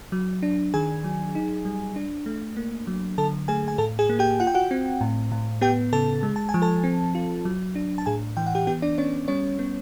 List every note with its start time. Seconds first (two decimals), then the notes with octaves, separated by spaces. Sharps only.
0.12 F#3
0.43 D4
0.74 D#3 G#4 G#5
1.04 F#3
1.35 D#4
1.65 G3
1.96 D4
2.26 A3
2.57 A#3
2.87 F#3
3.18 D3 A4 A5
3.48 A3 G#4 G#5
3.68 G#5
3.78 A2 A4 A5
3.99 G#4 G#5
4.09 A#3
4.19 G4 G5
4.40 F4 F#5
4.47 G5
4.54 F#4 F#5
4.71 C4
5.01 A2
5.32 A2
5.61 B3 G4 G5
5.93 C#3 A4 A5
6.23 G#3
6.36 A5
6.49 G#5
6.54 F3
6.62 A4 A5
6.84 C4
7.15 F4
7.45 F#3
7.75 D4
7.98 A5
8.06 A2 G#4 G#5
8.37 E3 G5
8.47 F#5
8.55 G4 G5
8.67 B3 G4 G5
8.82 D4 D5
8.98 B3 C#4 C#5
9.28 G3 C#4 C#5
9.59 B3